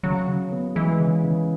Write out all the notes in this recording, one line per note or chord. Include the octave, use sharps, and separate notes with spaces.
C#3 F#3
C#3
B3
E3 G#3
C#3
C#3